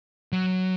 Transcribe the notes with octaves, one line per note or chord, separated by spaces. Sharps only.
F#3